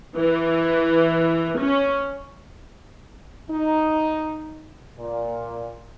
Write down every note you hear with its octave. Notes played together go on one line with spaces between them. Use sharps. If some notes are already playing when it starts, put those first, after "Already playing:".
E3
C#4
D#4
A#2